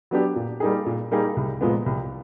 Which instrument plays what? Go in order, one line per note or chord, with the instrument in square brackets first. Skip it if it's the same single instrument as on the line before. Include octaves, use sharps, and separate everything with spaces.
[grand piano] F#3 B3 D4 G4
A#2
G3 A#3 D#4 G#4
A#2
G3 A#3 D#4 G#4
C2
A#2 F3 G#3 B3
C2